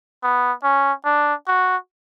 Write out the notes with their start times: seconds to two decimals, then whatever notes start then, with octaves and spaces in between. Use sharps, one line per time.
0.23 B3
0.63 C#4
1.05 D4
1.48 F#4